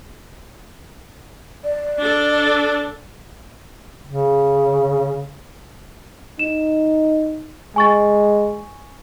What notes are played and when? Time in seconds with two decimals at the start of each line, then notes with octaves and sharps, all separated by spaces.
1.64 D5
1.99 D4 A4
2.46 D5
4.07 C#3
6.39 D#4 E7
7.76 G#3 G#5 C#6 A6